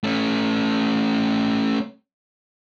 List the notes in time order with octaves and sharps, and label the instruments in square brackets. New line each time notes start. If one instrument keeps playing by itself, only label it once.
[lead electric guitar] A3 C#4